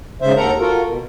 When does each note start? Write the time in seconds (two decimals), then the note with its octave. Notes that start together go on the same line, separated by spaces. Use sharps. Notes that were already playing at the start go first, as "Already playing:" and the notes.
0.22 G#2 C#3 C5 E5
0.36 D#2 A4 A#4 F#5 A#5
0.59 F4 F#4 A4 A#4
0.87 B2